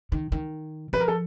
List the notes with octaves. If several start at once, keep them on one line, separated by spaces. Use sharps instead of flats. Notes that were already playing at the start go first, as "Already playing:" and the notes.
D#3
D#3
F3 B4
A#4
A4